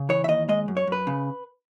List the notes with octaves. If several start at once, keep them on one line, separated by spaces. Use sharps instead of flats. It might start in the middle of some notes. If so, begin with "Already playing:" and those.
Already playing: C#3
E3 C#5
E5
D#2 D#5
G#3 D#5
F#2
C#5
F#2 B4
C#3